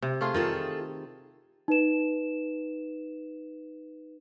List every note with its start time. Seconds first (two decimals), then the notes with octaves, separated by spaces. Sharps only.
0.02 C3
0.21 A3 F4 G#4
0.34 D#3 F4 G#4 A4
1.68 D#4 B4 E7